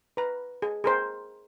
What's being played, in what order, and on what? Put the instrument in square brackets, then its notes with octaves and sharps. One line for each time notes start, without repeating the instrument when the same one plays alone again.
[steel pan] B4 A#5
G#4
G#4 A#4 C5